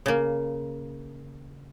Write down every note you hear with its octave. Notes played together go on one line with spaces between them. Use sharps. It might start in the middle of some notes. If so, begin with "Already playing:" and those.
C#3 A#3